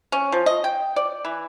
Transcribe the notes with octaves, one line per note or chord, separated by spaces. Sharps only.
C#4
F3
D#5
G5
D5
E3